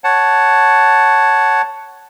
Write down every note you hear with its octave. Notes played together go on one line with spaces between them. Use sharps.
C#5 F#5 A5